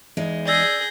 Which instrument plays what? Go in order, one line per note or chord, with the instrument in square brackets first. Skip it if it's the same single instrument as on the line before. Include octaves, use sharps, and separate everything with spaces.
[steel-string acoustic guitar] E2 G#3 D#4
[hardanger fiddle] G#4 [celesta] D5 E6 [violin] G6 A#6